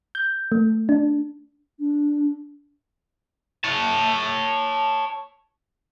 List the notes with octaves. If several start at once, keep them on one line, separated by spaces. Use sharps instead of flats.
G6
A3
D4
D4
C#5 A5